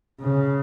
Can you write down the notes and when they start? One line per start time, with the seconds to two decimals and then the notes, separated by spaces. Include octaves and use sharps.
0.22 C#3